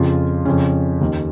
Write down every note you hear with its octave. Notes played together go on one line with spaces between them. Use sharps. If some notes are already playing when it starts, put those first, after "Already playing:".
Already playing: F2 C#3 F4
F2 C#3 C#4
D#2 D#3